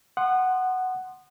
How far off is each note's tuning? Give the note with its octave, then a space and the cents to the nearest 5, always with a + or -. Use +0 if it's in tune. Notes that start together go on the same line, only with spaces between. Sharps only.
F#5 +5 C6 +0 D#6 -30